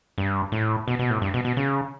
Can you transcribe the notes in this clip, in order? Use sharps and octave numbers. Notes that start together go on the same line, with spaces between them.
G2
A2
B2
B2
A2
G2
B2
B2
C#3